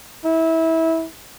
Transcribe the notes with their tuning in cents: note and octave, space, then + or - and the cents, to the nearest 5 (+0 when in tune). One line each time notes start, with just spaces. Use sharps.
E4 -20